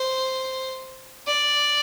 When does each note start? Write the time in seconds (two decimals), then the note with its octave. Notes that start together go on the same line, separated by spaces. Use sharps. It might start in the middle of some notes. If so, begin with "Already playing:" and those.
Already playing: C5
1.27 D5